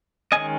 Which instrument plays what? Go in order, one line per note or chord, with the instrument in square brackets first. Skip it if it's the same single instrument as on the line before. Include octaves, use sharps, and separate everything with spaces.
[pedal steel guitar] D#3 G#3 C#4 D#5 G#5